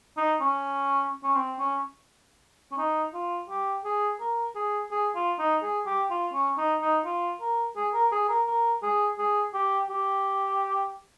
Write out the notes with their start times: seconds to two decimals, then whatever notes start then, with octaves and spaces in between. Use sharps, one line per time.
0.17 D#4
0.41 C#4
1.24 C#4
1.36 C4
1.59 C#4
2.72 C#4
2.78 D#4
3.14 F4
3.49 G4
3.85 G#4
4.20 A#4
4.55 G#4
4.91 G#4
5.15 F4
5.39 D#4
5.62 G#4
5.86 G4
6.11 F4
6.34 C#4
6.58 D#4
6.81 D#4
7.05 F4
7.41 A#4
7.76 G#4
7.94 A#4
8.12 G#4
8.29 A#4
8.47 A#4
8.83 G#4
9.18 G#4
9.54 G4
9.90 G4